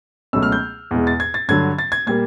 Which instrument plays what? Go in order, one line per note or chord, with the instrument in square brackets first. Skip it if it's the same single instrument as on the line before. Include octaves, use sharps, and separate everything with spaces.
[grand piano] C#2 B2 F#3 A3 E6
F6
G6
E2 B2 G#3
A6
G#6
A6
G2 D3 F#3 G#6
A6
G#6
A#2 G3 A#3 G#6